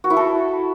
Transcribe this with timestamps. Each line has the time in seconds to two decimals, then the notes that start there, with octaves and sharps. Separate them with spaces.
0.04 F#4
0.10 E4
0.17 A4